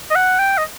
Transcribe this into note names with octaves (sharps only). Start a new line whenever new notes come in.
D#5
F#5
G5
D#5